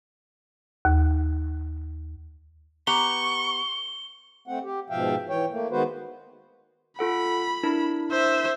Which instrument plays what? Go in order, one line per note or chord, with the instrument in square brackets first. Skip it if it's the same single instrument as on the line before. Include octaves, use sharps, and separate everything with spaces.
[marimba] D#2
[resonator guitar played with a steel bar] B3 G4 A#5 [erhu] C#6 [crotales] G7
[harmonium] A3 C4 F#5
G4
G#2 B2 F3 E5 F5 G5
E3 C#5 G5
A3 A#3
D#3 G#3 B3 F#4 B4 C5
[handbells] F4 A4 F#5 [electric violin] B5
[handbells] D4 E4 A#4
[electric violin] C5 E5